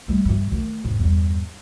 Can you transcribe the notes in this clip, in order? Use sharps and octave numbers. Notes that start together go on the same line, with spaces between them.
G3 A3
G2 E3
D#3 A3
E2 G#2
E2 G2